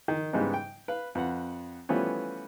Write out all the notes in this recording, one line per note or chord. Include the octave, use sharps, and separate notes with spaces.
D#3
G#2 C#3 E3 G3 B3 D#4
G5
B4 F5 B5
F2 B4 F#5
E3 F3 G3 A3 B3 C#4